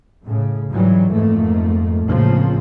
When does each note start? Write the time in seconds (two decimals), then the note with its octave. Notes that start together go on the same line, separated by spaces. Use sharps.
0.24 A2 C#3
0.70 G#2 C#3 E3 F#3 G3
1.11 F2 G#2 A3 A#3
2.07 A1 C#3 F3 A#3 C4